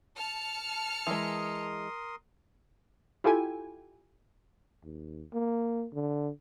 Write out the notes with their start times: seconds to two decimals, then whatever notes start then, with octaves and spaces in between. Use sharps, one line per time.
0.17 A5 F6 C#7
1.07 E3 G#3 A#4 C6 D#6
3.24 E4 F4 G4 A4 G5 G#5
4.83 D#2
5.33 A#3
5.93 D3